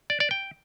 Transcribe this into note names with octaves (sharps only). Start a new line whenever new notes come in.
D5
D5
G5